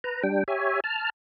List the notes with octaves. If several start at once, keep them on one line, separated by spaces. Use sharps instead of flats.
B4 A#5
G3 D4 G5
G4 C#5 E5 G#5
A5 F6